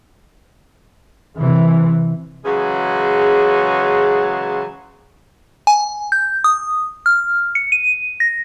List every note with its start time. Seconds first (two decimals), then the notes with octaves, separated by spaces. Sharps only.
1.38 C3 E3
2.45 C#3 E3 F#3 G#3 G#4
5.67 G#5
6.12 G6
6.44 D#6
7.06 F6
7.55 C#7
7.72 D#7
8.20 A#6